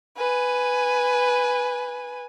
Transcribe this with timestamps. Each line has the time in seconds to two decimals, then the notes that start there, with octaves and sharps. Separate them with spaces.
0.17 B4 G#5